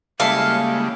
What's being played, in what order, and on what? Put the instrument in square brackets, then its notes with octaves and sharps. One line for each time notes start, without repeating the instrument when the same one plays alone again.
[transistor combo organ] C#3 G3 G#3 [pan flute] A#3 [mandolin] E4 A4 F5